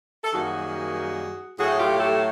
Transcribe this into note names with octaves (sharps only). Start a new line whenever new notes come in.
A4
F#2 D#3 G3 A#3 F#4 G#4
A2 F#3 A3 F#4 G#4
F4 G4
G4 A4